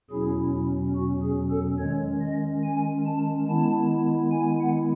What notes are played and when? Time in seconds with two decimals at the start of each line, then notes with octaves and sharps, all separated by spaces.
0.10 E2 B2 F#3 C#4 E4 G#4
0.53 E4
0.95 F#4
1.22 G#4
1.51 A4
1.79 D#3 G#3 C#4 C#5
2.21 D#5
2.64 G#5
3.05 A5
3.48 D#3 G#3 B3 E4 A5
4.32 G#5
4.60 F#5